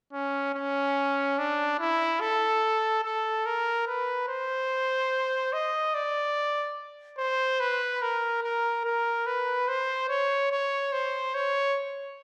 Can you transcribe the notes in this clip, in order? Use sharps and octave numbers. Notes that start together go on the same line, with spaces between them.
C#4
C#4
D4
E4
A4
A4
A#4
B4
C5
D#5
D5
C5
B4
A#4
A#4
A#4
B4
C5
C#5
C#5
C5
C#5